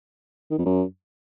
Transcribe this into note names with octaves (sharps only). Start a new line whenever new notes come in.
D#3
F2
F#2